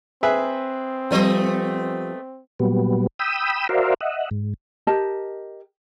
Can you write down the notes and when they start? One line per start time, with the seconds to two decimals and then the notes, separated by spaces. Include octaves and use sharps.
0.23 C4 G#4 B4 E5
1.11 F3 G3 A3 B3 D#5
2.59 A#2 F#3 G3 B3
3.19 G5 B5 D#6 E6
3.69 F#4 A#4 C5 D5 E5 F5
4.01 D#5 E5 F#5
4.31 G#2
4.87 G4 A#4 D#5 A5